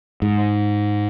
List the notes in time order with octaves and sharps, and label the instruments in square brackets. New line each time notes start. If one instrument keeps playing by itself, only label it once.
[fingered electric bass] G#2